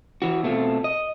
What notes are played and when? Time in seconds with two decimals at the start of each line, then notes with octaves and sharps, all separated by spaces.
0.22 E3 F#4
0.43 B2 A3 C4 F4
0.84 D#5